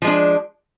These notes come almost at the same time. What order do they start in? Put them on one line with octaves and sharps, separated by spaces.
F3 G#3 D4